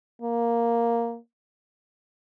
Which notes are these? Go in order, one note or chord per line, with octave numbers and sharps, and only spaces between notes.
A#3